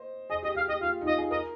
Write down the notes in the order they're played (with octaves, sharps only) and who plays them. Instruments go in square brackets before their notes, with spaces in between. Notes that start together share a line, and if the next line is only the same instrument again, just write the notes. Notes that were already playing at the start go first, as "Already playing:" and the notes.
Already playing: [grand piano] C5 D#5
[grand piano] G#4 [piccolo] D#5
[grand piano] G4 [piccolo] D#5
[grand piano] G4 [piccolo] F5
[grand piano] G4 [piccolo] D#5
[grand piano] F4 [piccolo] F5
[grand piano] D#4
[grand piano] F4 [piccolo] D#5
[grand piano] G#4
[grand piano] A#4 [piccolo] D#5